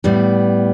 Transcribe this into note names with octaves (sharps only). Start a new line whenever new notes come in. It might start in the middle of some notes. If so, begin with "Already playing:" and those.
A2 G3 B3